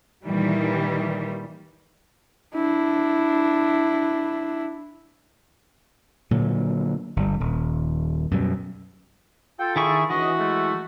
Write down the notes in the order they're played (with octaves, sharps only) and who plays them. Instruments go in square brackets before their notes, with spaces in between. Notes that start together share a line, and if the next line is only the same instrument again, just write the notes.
[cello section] A#2 D#3 E3 G3
[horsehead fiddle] D4 E4
[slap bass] A#2 D3 F#3
G1 G3
D#1
F#2 B2 G3
[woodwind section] F4 A4 [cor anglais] G5
[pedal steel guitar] D#3 E4 C#6 [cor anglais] G#4
[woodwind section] C#2 D4 D#5 [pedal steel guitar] E3 [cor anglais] F#4
[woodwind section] G#3 A3